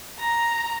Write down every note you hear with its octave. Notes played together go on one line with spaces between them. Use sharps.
A#5